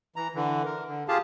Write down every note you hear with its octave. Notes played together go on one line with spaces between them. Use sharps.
E3 A#5
D3 E3
A#4
D3
F4 G4 G#4 F5 A5